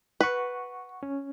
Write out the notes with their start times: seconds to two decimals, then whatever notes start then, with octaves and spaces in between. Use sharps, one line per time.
0.21 B4 F#5 C#6
1.03 C#4